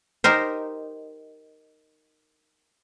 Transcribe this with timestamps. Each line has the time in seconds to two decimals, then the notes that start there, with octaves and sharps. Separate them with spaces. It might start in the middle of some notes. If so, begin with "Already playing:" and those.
0.24 D#4 G4 A#4 C5